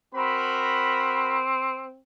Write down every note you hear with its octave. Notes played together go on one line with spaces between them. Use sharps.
C4 F#4 A#4 B5